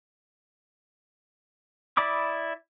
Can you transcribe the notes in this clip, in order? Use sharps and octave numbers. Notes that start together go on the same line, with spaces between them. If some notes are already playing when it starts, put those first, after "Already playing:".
E4 D5 B5 D6 D#6